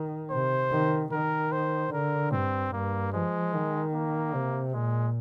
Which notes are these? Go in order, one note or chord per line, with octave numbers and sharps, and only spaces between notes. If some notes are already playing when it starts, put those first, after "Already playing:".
Already playing: D#3
C3 C5
D#3
D#3 A#4
C5
D3 A#4
G2 C4
G2 A#3
F3 G#3
D#3
A#3
C3
A#2 G#3